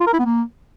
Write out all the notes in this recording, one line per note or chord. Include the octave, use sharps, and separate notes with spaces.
F4
A#4
E4
B3
A#3